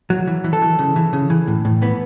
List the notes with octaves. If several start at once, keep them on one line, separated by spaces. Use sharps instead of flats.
F#3
E3
E3
A4
E3
C#3
E3
C#3
E3
A2
A2
E3 B3